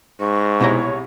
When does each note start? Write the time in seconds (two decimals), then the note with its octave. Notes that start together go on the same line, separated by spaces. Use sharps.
0.20 G#2 C#6
0.60 C2 B2 E4 C#5 A#5